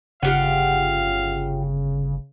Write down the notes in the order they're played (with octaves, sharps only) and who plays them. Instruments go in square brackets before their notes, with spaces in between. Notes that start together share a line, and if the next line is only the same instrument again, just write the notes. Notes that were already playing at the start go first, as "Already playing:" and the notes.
[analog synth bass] G1 [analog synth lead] C#3 [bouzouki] F4 G4 F#5 [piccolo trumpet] F5